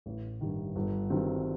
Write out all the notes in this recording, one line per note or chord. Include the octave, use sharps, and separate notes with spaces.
A1
G2 D#3
G1
G2 D#3 F#3 C4